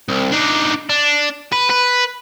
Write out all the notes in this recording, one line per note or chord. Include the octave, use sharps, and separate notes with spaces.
C2
D4 D#4
D4
B4
B4